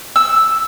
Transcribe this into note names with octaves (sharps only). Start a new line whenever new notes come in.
E6